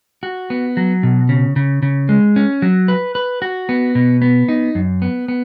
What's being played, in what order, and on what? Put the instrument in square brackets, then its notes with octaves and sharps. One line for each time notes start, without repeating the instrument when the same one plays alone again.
[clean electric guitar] F#4
B3
F#3
B2
C#3
C#3
C#3
G#3
C#4
F#3
B4
B4
F#4
B3
B2
B3
D#4
F#2
B3
B3